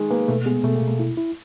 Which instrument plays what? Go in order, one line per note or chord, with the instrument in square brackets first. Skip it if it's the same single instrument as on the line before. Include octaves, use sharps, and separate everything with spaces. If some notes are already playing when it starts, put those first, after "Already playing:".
Already playing: [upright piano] D#3 G#3
[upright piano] A#3 [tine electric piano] B4
[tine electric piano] B2 [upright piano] A3
[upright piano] G#3 [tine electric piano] B3
[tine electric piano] B2 [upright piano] A3
[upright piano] A#3
[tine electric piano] B2
[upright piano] A3
[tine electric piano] E4
E4